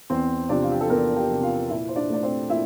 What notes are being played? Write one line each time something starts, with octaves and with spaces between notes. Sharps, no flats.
E2 C4 C5
C3 F3 D4 D5
F4
G4
A4
E2 A#3 A#4
G4 G5
C3 F3
F4 F5
A#2 E4 E5
C5
D4 D5
A3 D5
C4 C5
A#2 E4 E5